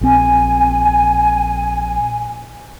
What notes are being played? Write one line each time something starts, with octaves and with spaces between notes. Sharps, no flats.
A#1 C4 G#5